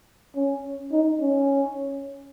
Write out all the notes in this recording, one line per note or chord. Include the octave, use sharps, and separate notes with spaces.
C#4
D#4
C#4